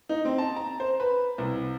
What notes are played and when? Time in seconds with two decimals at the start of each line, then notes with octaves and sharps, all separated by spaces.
0.09 D#4
0.25 C4
0.38 A5
0.56 A#5
0.80 C5
1.00 B4
1.38 C2